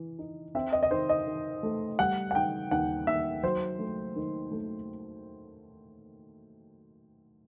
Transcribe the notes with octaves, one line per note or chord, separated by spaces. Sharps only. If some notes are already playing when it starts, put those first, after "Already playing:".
Already playing: E3
D#4
C4 E5
D#5
D#5
D#3 C5
D#5
D#3
A3
G3 F#5
F#5
D#3 G5
D#2 F#5
D#2 E5
F#3 C5
A3
D#3
A3